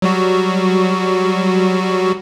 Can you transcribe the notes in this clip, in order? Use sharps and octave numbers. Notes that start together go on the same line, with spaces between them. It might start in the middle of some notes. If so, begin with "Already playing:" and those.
F#3 G3 F#4